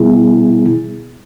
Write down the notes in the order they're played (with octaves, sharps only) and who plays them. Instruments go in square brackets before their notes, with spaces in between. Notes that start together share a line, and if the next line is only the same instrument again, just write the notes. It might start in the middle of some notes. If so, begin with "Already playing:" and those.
Already playing: [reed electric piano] B2 G3 B3 E4 G#4